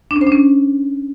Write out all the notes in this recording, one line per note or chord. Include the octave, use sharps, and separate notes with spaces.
D4
C#4
C5
D4
C#4